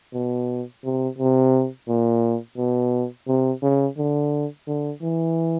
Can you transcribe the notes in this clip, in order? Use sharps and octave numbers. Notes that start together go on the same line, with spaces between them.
B2
C3
C3
A#2
B2
C3
C#3
D3
D3
E3